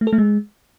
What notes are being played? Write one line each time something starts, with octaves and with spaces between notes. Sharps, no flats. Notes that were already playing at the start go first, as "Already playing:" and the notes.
A3
A4
A3
G#3